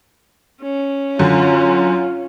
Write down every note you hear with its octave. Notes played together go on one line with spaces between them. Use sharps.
C#4
F#2 D3 F4